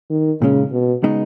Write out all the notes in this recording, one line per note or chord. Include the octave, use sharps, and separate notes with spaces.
D#3
A#2 C#3 G#3 C#4
B2
C#3 G#3 B3 D#4